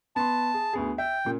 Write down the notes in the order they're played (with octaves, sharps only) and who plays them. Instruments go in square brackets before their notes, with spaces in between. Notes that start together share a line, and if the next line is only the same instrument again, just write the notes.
[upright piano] B3 C6 [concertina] A5
[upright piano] G#4
D2 B3 G#4
[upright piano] E5 [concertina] G5
[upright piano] A#2 C#3